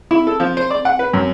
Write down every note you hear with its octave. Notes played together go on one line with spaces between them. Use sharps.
E4
A4
F3
C5
D5
F#5
B4
F#2